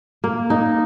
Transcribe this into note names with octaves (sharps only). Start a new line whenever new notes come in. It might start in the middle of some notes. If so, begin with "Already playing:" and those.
A#3
D#4